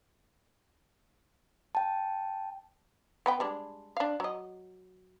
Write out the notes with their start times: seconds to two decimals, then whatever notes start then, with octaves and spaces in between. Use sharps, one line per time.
1.75 G5 A5
3.26 B3 B4 G5
3.40 G3 G#3 D4
3.97 D4 F5
4.20 F#3 D#5